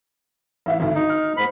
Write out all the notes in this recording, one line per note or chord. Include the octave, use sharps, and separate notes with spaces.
A1 E5 F5
G#1 D2
D#4
F6
G#2 B5